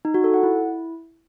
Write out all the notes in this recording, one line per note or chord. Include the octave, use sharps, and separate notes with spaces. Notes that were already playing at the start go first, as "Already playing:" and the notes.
D#4
F#4
A4
F#5
E4